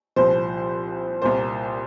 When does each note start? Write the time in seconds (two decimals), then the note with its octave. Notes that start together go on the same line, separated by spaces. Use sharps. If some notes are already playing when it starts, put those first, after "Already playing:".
0.16 C2 A#2 F3 C5
1.22 C2 A#2 A#3 C5